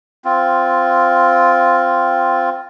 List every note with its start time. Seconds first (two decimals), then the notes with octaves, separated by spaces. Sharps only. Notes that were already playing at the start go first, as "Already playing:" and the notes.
0.25 C4 F4